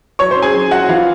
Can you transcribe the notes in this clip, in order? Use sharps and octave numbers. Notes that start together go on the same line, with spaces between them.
F#3 C#5 C#6
C5 C6
C#4
G#4 G#5
F#3
F#3 F#4 F#5
E3 F4 F5